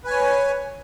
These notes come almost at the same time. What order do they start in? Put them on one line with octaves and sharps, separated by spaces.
B4 G#5 C#5